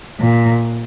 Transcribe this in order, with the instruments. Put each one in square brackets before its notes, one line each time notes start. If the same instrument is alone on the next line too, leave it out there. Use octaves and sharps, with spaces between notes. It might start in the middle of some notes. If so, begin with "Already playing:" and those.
[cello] A#2